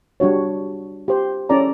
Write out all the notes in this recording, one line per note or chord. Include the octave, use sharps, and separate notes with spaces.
G3 D4 F#4 C#5
G4 C5
C#4 E4 A4 D5 A#5